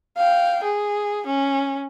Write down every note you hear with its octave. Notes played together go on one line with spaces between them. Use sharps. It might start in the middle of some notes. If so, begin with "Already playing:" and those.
F5 G5
G#4
C#4